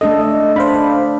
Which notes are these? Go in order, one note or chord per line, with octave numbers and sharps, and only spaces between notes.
A3 D4 A4 D#5
D4 C5 F5 B5